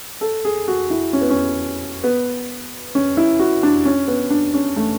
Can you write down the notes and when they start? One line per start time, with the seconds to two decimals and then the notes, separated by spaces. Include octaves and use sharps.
0.21 A4
0.45 G#4
0.68 F#4
0.90 E4
1.13 C#4
1.21 B3
1.30 C#4
2.04 B3
2.95 C#4
3.17 E4
3.39 F#4
3.63 D4
3.85 C#4
4.08 B3
4.30 D4
4.54 C#4
4.76 A3